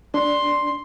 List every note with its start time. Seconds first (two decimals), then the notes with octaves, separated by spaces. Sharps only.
0.14 D4 C6